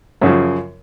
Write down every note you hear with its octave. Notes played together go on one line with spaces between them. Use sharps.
F#2 C#3 F3